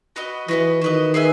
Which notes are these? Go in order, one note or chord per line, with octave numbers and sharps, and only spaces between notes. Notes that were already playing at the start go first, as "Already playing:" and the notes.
F#4 B4 D#5
E3 F#4 B4 D#5
D#3 F#4 B4 D#5
G#4 B4 E5 G#5